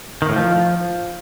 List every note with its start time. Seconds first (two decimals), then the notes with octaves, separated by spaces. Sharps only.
0.22 D#3
0.29 A2
0.36 F3